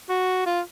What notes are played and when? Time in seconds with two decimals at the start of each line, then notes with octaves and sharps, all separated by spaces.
0.09 F#4
0.46 F4